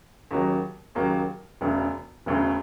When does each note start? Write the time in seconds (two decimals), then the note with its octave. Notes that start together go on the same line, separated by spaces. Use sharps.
0.31 D#2 C#3 F#3 A#3
0.95 D#2 C#3 F#3 A#3
1.61 E1 D2 C#3
2.26 E1 D2 C#3